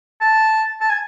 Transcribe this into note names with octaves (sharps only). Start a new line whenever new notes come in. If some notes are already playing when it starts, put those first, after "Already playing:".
A5
A5
G#5